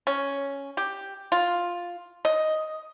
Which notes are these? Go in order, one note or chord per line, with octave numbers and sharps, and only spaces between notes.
C#4
G4
F4
D#5